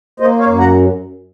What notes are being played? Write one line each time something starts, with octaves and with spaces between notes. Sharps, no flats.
A#3 C5 D#5
C#5 F5
F#2
F#5 A#5